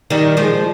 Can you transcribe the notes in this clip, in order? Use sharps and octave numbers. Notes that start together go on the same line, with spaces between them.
D#3 G3
F3 G#3